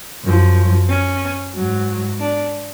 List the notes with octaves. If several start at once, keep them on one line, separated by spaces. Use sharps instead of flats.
F#2 F3
C#4
G#2 F#3
D4